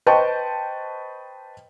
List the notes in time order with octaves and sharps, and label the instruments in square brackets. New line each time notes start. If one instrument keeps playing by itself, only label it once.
[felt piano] B4 C5 D#5 G5 A5 C#6